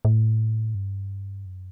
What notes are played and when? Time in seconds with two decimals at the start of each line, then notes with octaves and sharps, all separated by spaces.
0.05 A2
0.75 G2
1.46 F#2